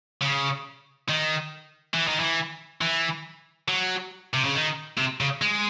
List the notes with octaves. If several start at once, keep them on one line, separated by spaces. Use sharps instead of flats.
C#3
D#3
E3
D#3
E3
E3
F#3
C3
C#3
D#3
C3
C#3
G#3